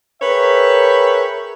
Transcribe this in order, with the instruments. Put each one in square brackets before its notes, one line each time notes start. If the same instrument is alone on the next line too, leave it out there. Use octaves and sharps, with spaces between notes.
[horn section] G#4 A#4 B4 C#5 E5 G5